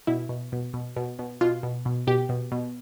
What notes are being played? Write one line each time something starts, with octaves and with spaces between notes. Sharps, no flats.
B2 E4
B2
B2
B2
B2
B2
B2 F4
B2
B2
B2 G4
B2
B2